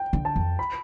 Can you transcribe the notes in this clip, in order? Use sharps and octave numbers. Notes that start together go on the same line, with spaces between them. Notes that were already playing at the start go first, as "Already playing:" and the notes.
Already playing: G5
D3
A5
F2
B5